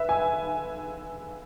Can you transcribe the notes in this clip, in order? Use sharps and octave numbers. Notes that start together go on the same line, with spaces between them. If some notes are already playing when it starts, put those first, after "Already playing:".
Already playing: B4 E5
G#5